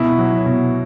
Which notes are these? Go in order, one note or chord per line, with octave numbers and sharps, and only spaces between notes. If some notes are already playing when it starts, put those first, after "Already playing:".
Already playing: B2 E4
F#3
B2